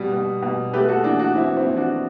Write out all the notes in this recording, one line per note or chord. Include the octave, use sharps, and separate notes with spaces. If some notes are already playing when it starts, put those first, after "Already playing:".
Already playing: B2 G3 F#4
B2
B2
A3 G4 B4
F#4 A4
E3 D4 F#4
D4 F#4
E3 C4 E4
C4 E4
E3
D4 F#4